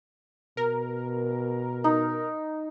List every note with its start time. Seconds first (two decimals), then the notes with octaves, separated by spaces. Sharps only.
0.57 B2 A#4
1.84 D#4